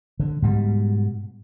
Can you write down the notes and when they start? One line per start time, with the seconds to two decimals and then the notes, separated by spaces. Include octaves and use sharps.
0.20 D3
0.42 G#2 B2 G3